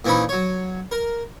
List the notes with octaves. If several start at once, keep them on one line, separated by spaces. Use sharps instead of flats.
A#2 E3 C4 C#4 D#4 B5
F#3 C#5
A#4